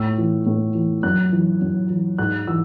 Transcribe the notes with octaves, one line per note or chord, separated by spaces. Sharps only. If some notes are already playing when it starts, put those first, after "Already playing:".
Already playing: A2 E6
E3
A2
E3
F#2 F#6
E3
F#2
E3
G#2 F#6
E3 E6